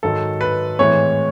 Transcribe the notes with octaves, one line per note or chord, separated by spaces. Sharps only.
G#2 D#3 F#3 A4
B4
A2 E3 G#3 C4 C#5